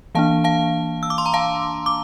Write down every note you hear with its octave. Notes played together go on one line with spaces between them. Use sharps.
E3 A#3 D4 F5 A5
F5 A5
E6
D6
C6
A#5
F5 A5
D6